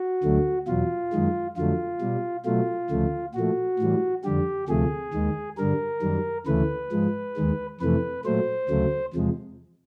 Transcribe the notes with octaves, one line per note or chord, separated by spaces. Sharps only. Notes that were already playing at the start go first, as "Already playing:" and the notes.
Already playing: F#4
D2 D3 F#3 A3
E2 B2 F#3 F4
F#2 D#3 G#3
F2 D3 F#3 A3 F4
B2 G3
B2 F#3 A3 F4
D2 C#3 F3 A3
A#2 F3 A3 F#4
A2 E3 G3
F2 D3 G3 G4
D2 C3 F3 A3 G#4
D#2 D#3 G#3
G2 D3 G3 A#4
F#2 D#3 G3
D2 C#3 E3 A3 B4
G#2 F3 G#3
D#2 D#3 G#3
F2 C3 E3 A3 B4
A#2 F#3 A3 C5
D2 C#3 F#3 A3
E2 C3 F3 G#3